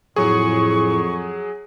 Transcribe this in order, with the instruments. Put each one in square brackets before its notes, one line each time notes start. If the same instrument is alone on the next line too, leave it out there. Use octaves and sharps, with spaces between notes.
[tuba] F2 [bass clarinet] A2 [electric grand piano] F#3 G#4 [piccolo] C#6